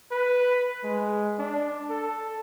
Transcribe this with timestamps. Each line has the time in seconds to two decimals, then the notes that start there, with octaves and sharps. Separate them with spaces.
0.11 B4
0.84 G#3
1.39 D4
1.90 A4